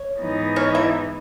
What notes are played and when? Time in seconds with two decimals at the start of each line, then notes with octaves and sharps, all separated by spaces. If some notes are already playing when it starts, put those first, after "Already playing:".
Already playing: C#5
0.18 G#2 E3 B3 D#4
0.56 C#4 C#5
0.75 E4 E5